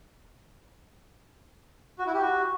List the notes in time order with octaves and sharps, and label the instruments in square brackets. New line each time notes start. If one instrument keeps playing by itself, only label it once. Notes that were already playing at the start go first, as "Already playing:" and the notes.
[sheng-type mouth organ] F#4
E4
G4
F#4